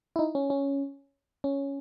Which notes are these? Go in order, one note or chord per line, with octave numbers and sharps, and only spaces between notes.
E4
D#4
C#4
C#4
C#4